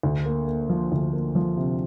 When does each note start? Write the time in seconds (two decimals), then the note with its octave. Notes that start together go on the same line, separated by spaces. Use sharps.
0.03 D2
0.26 A#3
0.47 A#3
0.70 F3
0.92 D2
1.13 A#3
1.35 F3
1.57 C3